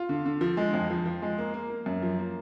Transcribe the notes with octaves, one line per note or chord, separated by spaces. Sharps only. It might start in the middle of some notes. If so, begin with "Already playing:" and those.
Already playing: F4
D3
D3
F3
G#3
F2
F3
F3
G#3
A#3
A#3
A#3
F#2
F3
A#3